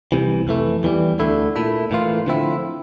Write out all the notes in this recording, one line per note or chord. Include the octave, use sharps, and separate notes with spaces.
C2 C3 E3
F2 E3 A3
E2 E3 G3
D2 D3 A3 E4
A#2 A3 E4
A2 E3 A#3 F4
D3 F3 C4 E4